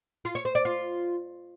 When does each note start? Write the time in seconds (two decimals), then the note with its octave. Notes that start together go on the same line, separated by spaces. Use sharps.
0.25 F4
0.35 C#5
0.45 C5
0.55 D5
0.65 F4